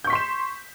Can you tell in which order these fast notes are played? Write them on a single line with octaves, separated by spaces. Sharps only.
G6 C#6 B6 C6 E7